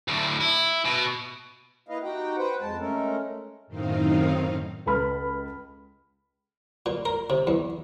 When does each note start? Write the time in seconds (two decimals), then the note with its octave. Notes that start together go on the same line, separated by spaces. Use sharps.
0.08 D2 A2
0.41 E4
0.85 B2
1.89 A#3 E4 B4 D#5 F5
2.03 D#4 F#4 G4 F#5 G5
2.38 B4 C5 F#5 G5
2.61 F2 G#3 A5
2.78 G#3 A3 C#4 A4 A#4
3.67 F#2 A2 D#3 C4 D#4 F5
4.86 C#2 A4 B4 B5 F6
6.86 A#2
7.05 A#4
7.30 C3
7.47 E2